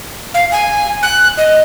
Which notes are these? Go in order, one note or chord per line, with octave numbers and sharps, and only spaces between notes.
F5
G#5
F#6
D#5